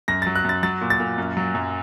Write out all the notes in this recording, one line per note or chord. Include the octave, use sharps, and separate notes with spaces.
F#2 A#6
F#3 A6
F#6
F#2 A6
F#3 A6
A#2
A6
A#2
F#2
F#3
F#2